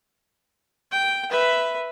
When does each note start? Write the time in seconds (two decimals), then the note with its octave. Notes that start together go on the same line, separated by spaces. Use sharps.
0.92 G5
1.30 B4 E5